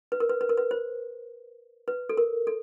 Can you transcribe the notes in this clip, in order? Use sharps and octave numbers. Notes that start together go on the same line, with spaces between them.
B4
A#4
B4
B4
A#4
B4
C5
B4
A4
A#4
A4